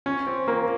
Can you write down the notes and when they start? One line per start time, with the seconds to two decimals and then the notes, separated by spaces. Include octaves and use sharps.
0.06 C#4
0.27 C4
0.48 A#3